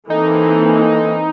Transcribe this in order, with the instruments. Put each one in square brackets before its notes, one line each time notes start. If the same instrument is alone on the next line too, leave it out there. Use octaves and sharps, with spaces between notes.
[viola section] E3 A#3 C4 [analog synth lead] D#4 [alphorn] A4